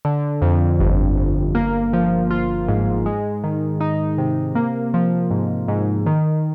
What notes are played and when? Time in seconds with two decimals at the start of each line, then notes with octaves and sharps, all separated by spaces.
0.05 D3
0.42 F2
0.80 G1
1.17 G1
1.55 A#3
1.93 F3
2.31 F4
2.69 G#2
3.06 G#3
3.44 D#3
3.81 D#4
4.18 C3
4.55 A#3
4.94 F3
5.31 G#2
5.68 G#2
6.06 D#3